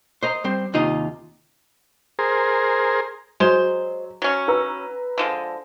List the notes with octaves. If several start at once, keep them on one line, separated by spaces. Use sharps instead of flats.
C5 D#5 A#5
G3 C4 C5
D#2 C3 D#4 F4 D#5 A#5
G#4 A#4 C5
F#3 G#3 C5
F#3 C#4
B4 A#5 E6
D3 F3 G#3